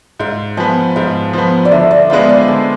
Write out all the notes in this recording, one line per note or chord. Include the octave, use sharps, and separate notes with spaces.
G#2 F5
F3 B3 G#5
G#2 F5
F3 B3
D5
D3 E5
D5
G#3 B3 D4 F4 C5
D5
D3 G#5